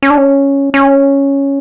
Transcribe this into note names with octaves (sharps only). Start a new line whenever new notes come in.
C#4
D4
C#4
C#4